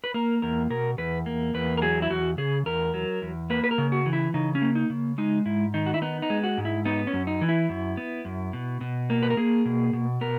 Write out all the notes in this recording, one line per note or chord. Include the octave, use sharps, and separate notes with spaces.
B4
A#3 A#4
E2 A#4
B2 A#4
E2 B4
A#3
E2 B4
A#4
F#3 G#4
E4
E2 F#4
C#3 G#4
E2 A#4
F#3
E2
A#3 B4
B4
A#4
C#3
F#4
E3
E4
C#3 D#4
C#4
A#3
D#4
C#3
G#3 D#4
G#2 E4
D#3 D#4
F#4
E4
B3 D#4
D#4
G#3
F#4
G#2
E4
B3 D#4
C#4
F#2
D#4
E3
E4
F#2
B3
F#2
B2
B2
A#3
B4
A#4
A#3 G#4
B2
B2
B3 A#4